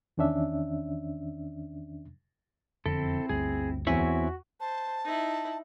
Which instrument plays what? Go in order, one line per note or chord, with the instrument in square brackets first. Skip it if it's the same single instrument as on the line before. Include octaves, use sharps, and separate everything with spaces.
[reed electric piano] E2 D#3 C#4 D4 E5
[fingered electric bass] E1 F2 D3 [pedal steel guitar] C4 E4 [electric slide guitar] A4
[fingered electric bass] G1 D2 [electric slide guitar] G#4
[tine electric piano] E2 G#5 B6 [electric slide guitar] C4 E4 C#5 [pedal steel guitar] F#4
[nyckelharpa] C5 [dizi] A5
[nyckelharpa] D#4 E4